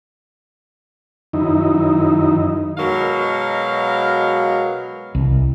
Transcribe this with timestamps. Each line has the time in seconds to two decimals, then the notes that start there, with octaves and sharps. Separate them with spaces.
1.33 F#2 D#3 D#4 E4
2.78 B2 F#3 G#3 A#4 F5
5.15 C2